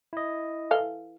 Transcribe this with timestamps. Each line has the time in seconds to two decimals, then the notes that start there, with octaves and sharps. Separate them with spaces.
0.13 E4 D#5
0.71 E3 A4 F5